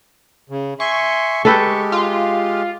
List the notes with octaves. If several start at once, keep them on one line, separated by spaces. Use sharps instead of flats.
C#3
E5 G#5 C6 C#6
G#3 G4 A4 B4 G5
F4